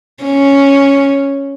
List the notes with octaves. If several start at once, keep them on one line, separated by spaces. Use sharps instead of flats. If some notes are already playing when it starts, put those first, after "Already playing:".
C#4